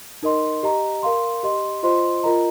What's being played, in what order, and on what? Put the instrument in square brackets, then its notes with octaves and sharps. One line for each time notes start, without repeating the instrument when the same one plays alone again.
[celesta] D#4 A#4 D#5 C6
G4 D#5 A#5
A#4 F5 C6
G4 D#5 C6
F4 C5 D#5 C6
F4 A#4 D#5 A#5